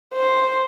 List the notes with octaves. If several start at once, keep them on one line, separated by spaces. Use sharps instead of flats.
C5